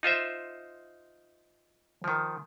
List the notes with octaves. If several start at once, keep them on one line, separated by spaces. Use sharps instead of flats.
D#4 F4 C5 E5
D#3 F3